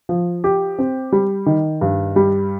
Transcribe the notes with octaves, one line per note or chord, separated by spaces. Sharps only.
F3
G4
C4
G3
D#3
G2
G3